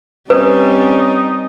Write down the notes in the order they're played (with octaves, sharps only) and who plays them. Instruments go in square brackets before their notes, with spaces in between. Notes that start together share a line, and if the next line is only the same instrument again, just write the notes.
[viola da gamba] G3 C4 [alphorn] C#4 [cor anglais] D#4 [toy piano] B4